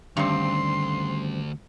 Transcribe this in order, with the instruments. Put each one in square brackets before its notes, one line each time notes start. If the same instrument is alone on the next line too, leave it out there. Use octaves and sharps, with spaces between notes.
[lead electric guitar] D2 [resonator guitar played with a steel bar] G2 C4 [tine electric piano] D#3 G3 C#4 [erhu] C6